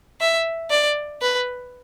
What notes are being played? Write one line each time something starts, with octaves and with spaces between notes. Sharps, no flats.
E5
D5
B4